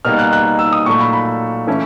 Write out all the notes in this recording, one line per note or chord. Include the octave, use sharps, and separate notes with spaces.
B2 G3 A#3 D#4 F6
F#6
F#6
E6
D#6
A#2 F#3 A3 C#6
B5
B5
E3 A3 C#4 E4